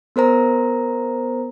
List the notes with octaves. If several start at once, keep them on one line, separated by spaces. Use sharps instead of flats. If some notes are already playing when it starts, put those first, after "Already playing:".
B3 A#4 C5 A#5